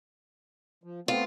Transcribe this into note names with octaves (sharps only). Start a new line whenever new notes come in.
F3
A3 B3 C4 F4